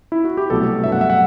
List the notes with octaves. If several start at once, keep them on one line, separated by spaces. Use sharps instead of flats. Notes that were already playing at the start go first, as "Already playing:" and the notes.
E4
F#4
G4
C2 B2 F#3 A3 A4
G2 F#3 A3 E5
F#5
E5
F#5